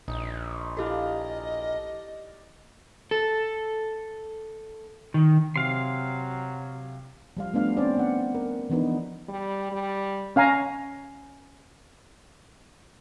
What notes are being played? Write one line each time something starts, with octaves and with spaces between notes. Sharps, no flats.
A#1 D#4
E4 G4 A4 D5 D#5 F5
A4
D#3
C3 F#3 F5 C6
F3 G3 F5
A3 B3 D4 F5
C4 C#4 C5 D5
B3 F#5
A#4
E3 F3 B3 D4 D#4
G3
G3
C#4 F5 G#5 A#5